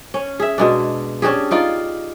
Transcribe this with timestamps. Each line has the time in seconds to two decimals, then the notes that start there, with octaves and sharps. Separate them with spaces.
0.14 C#4
0.40 G#4 E5
0.58 B2 G#3 D4
1.22 C#4 D4 G4 G#4
1.51 D#4 F4 D5